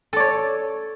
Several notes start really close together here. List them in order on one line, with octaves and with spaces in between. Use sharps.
A4 D5 C#5